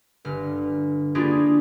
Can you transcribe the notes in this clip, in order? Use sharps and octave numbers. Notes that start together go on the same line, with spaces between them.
G1 F6
A#3 D4 E4 F4 G4 G#4